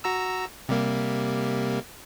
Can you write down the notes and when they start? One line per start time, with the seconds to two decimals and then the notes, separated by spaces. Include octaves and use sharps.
0.04 F#4 A#5 E6
0.69 C3 G3 A#3